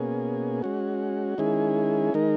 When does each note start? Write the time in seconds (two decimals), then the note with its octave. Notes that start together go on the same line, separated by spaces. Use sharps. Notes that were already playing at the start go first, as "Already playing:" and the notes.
Already playing: B2 A#3 C#4 G#4
0.62 G#3 C#4 F#4
1.38 D#3 G#3 C#4 E4 G#4
2.14 D#3 G#3 D#4 A#4